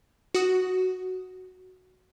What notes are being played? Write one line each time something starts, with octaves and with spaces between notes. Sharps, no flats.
F#4 D#6